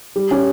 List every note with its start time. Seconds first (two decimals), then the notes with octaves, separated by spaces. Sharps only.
0.16 G3
0.31 C#4 G4